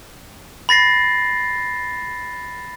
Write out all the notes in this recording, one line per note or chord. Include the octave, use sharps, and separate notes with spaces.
B5 A6 A#6 C7